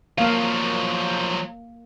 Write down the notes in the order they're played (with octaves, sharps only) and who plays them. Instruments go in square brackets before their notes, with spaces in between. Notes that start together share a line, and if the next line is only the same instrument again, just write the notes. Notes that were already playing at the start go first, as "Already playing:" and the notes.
[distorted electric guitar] F3 F#3 [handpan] A#3 F5